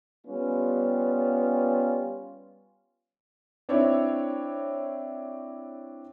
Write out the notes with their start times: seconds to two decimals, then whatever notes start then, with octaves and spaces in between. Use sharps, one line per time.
0.27 G3 B3 C#4 F4
3.69 C4 D4 E4 C#5